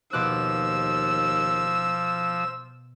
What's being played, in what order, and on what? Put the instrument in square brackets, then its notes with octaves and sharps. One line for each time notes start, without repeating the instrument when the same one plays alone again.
[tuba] D#2 [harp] B2 D6 F#6 [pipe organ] F3 [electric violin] E6